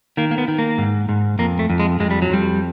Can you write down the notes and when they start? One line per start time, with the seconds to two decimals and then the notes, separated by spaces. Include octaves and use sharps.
0.17 D#3 A#3
0.31 A#3
0.38 B3
0.48 D#3
0.59 A#3
0.78 G#2
1.09 G#2
1.39 F2 A#3
1.59 A3
1.70 F2
1.80 G#3
2.00 F2 G#3
2.11 G3
2.22 F#3
2.30 F2 G3